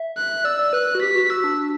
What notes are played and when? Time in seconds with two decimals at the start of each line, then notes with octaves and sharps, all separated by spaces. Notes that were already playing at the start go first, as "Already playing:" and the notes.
Already playing: E5
0.17 F#6
0.44 D5 E6
0.59 D5
0.73 B4 F#6
0.87 B4
0.95 F#4
1.01 G4 B6
1.15 F#4
1.30 F#4 E6
1.44 D4